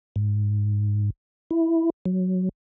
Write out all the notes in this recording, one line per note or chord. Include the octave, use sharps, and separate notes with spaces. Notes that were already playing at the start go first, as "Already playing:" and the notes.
G#2
E4
F#3